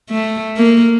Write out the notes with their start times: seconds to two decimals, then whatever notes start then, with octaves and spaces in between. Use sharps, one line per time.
0.10 A3
0.57 A#3